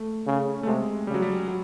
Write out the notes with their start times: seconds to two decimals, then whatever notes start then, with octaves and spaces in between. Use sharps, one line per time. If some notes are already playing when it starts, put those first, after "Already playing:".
Already playing: A3
0.27 C#3
0.63 A3
0.67 C3 G#3
1.07 C#3 G3
1.14 F#3
1.22 G3
1.48 F#3